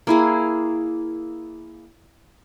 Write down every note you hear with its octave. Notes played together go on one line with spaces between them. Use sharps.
A#3 E4 G#4